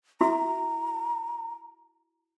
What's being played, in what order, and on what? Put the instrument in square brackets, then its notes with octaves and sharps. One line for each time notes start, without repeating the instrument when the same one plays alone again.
[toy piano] E4 F#4 E5 [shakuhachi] A#5